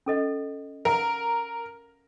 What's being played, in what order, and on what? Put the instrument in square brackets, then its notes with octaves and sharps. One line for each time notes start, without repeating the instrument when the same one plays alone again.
[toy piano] C#4 A4 D#5
[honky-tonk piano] A#4 [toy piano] F5 F#5